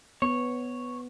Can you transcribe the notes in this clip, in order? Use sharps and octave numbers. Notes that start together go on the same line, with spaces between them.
B3 C#5